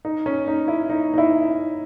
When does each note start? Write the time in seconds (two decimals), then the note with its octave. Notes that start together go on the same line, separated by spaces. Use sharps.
0.05 D#4
0.26 C#4
0.48 D#4
0.68 E4
0.90 D#4
1.14 D#4
1.18 E4